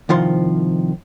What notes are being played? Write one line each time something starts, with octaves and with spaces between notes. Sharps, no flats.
C2 D#3 F3 C6